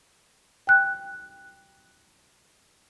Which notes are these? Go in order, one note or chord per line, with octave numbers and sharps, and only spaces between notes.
G5 F#6